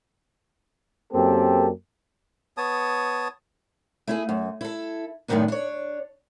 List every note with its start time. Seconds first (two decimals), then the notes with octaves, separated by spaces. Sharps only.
1.13 F#2 A#3 C4 G4 A4
2.57 B3 C#5 A5 D#6
4.07 A3 E4 G#4
4.29 F#2
4.61 E4 A4
5.28 F#2 A2 D3 D#3 B3 D4
5.48 D4 C#5